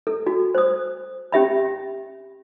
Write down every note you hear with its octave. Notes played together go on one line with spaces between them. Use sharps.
A4
F#4
C5 D#6
C#4 G4 E5 B5